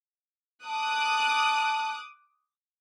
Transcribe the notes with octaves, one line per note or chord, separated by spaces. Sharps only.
A5 D6 D#6 F#6